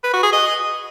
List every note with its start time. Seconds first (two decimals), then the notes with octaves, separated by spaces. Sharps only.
0.04 B4
0.13 F#4
0.23 G#4
0.33 D#5